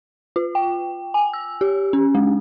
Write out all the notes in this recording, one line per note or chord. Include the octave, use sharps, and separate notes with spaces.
F4
G5
G#5
E6
G4
C#4
G#3